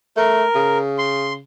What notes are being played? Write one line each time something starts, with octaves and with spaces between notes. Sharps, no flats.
A3 A#4
C#3
C6